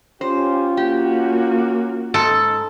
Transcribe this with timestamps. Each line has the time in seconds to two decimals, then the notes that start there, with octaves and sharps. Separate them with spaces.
0.21 C#4 F4 G4 C5
0.77 A#3 F#4 G4
2.14 G#2 A4